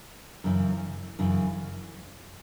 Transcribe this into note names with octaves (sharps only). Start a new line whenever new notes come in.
F#2 C#3 E3
F#2 C#3 E3